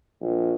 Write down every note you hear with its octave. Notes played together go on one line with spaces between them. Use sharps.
A#1